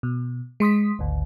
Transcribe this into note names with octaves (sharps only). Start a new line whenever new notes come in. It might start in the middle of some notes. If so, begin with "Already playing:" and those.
B2
G#3 C6 D#6 B6
G#1 D2